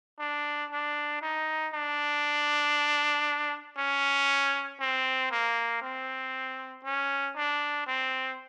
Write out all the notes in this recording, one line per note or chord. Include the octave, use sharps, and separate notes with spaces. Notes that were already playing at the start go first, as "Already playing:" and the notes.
D4
D4
D#4
D4
C#4
C4
A#3
C4
C#4
D4
C4